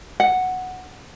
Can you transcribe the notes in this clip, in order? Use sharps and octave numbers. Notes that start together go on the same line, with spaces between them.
F#5